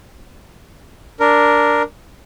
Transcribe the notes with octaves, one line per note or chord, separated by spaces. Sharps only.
D4 A#4